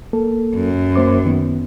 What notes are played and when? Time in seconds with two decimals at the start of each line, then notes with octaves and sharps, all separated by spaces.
0.13 A#3 A4
0.54 F#2
0.96 A#3 C5 D6
1.26 D#3 B3